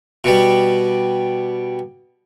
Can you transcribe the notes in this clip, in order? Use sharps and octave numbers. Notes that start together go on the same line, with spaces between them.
B2 G3